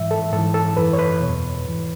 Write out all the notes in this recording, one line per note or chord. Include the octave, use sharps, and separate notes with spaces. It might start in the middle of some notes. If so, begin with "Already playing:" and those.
Already playing: G#2 E3 E5
A4
G#2 E3 A4
A4
F#2 E3 B4
C#5
B4
E2 B2
G#2 E3